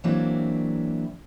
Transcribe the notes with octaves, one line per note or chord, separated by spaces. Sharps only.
E3 F#3 A#3 C4 D4 E4